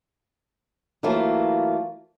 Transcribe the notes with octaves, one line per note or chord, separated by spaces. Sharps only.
E3 F#3 A3 A#3 F4